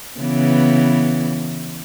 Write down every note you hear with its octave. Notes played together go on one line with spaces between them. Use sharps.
C#3 E3 B3